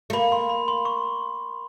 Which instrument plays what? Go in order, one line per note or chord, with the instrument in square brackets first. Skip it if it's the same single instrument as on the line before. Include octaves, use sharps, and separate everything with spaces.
[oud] A3
[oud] A#3 [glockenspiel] B5
[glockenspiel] C6
B5
C6
C#6